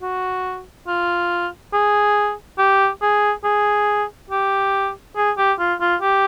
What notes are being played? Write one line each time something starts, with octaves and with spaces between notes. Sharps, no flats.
F#4
F4
G#4
G4
G#4
G#4
G4
G#4
G4
F4
F4
G4